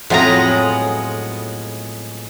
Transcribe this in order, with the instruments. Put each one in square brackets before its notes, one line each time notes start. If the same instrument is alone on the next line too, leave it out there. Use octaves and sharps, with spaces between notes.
[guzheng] F2 F3 F#3 [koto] A2 A#5 [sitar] G#3 B3 F4